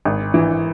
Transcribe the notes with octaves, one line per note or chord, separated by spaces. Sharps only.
G#1
E3